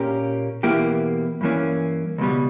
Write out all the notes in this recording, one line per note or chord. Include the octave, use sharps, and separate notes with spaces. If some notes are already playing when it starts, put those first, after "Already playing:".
Already playing: A#2 A#3 C#4 G4 A#4
E2 B2 A#3 E4 G4
G2 E3 A#3 C#4
C#2 B2 G3